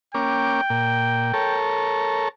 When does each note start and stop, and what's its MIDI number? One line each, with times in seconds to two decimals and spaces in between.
0.14 0.61 58
0.14 0.61 61
0.14 1.58 79
0.14 0.61 86
0.70 1.32 46
1.34 2.29 69
1.34 2.29 70
1.34 2.29 73